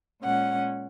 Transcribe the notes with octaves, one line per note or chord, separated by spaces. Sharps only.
A#2 G#3 C#4 F#5